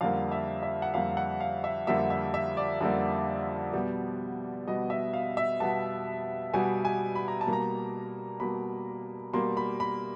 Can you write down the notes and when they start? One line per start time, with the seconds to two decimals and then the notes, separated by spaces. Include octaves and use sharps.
0.01 F2 D3 G3 A#3 F5
0.32 E5
0.63 E5
0.82 F#5
0.94 F2 D3 G3 A#3 F5
1.11 F5
1.17 F#5
1.40 F5
1.64 E5
1.87 F2 D3 G3 A#3 E5
2.10 E5
2.34 E5
2.57 D5
2.81 F2 D3 G3 A#3
3.73 B2 G3 B3
4.67 B2 G3 B3 D#5
4.90 E5
5.13 F5
5.37 E5
5.60 B2 G3 B3 A5
6.53 B2 G3 B3 G#5
6.85 G#5
7.15 B5
7.28 A#5
7.41 A5
7.47 B2 G3 A#3
7.53 A#5
8.40 B2 G3 A#3 B5
9.33 B2 G3 A#3 C6
9.57 B5
9.80 B5